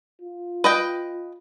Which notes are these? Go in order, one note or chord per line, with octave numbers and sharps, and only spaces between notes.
F4
B4 D#5 G5